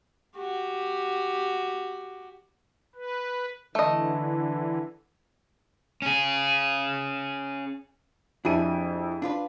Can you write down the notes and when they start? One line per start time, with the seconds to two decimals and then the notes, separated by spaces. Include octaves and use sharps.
0.37 F#4 G4
2.96 B4
3.75 D3 E3 A3 D#5
6.02 C#4 G#4
8.45 F2 D4 E4 G4 G#4 D#7
9.22 D4 F4 B4